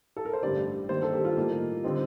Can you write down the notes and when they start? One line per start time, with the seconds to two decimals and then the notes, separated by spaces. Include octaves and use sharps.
0.17 A4
0.25 A#4
0.33 C5
0.42 A1 G2 D3 G3 D5
0.89 G2 D#3 A#3 D4 C5
1.02 A4
1.13 G4
1.25 F4
1.37 A2 G3 A#3 D#4
1.84 D3 G3 C4 D#4